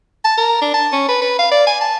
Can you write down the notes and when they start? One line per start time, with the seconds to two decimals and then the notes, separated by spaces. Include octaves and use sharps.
0.24 A5
0.38 A#4
0.62 D4
0.74 A5
0.92 C#4
1.08 B4
1.22 B4
1.39 F5
1.52 D5
1.67 G#5
1.81 A5